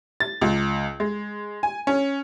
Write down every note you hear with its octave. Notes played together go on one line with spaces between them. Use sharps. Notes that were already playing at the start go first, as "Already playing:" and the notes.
A6
C#2
G#3
G#5
C#4